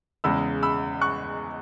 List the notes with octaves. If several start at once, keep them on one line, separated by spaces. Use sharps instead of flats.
E2 C#3 G#3 B5 E6
B5 E6
C#6 F#6